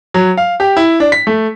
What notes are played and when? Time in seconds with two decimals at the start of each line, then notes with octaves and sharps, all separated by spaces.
0.14 F#3
0.37 F5
0.60 G4
0.77 E4
1.00 D4
1.12 B6
1.27 A3